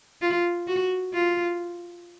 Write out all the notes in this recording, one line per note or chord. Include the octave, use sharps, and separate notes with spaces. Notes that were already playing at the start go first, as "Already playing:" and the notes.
F4
F#4
F4